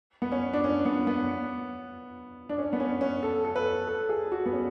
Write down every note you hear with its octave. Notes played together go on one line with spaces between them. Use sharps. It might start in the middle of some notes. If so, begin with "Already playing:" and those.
B3
C#4
D4
C#4
B3
B3
D4
C#4
B3
C#4
C#4
A4
A4
B4
A4
G#4
F#4
B3
C#4